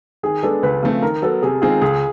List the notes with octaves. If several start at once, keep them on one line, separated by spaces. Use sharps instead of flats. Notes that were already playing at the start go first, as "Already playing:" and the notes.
D#3 G#4
G#3 B3 D4 A4
C#2 B4
C#3 F3 A3 C4
D#3 A#4
F#3 B3 A4
C3 G#4
D#3 G#3 C4 F4 G#4
C#2 G#4